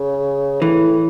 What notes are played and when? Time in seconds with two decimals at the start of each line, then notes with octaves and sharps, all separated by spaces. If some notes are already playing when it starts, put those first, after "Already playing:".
Already playing: C#3
0.61 A2 E3